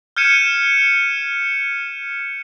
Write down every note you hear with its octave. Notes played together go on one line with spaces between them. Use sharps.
F6 G6 G#6 C#7 D#7 E7